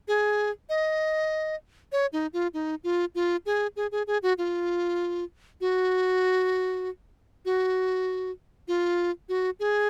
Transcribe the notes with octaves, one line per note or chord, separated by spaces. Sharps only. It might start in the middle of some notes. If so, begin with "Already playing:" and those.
G#4
D#5
C#5
D#4
F4
D#4
F4
F4
G#4
G#4
G#4
G#4
F#4
F4
F#4
F#4
F4
F#4
G#4